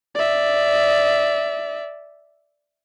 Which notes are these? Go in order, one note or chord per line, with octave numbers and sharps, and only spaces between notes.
D5 E5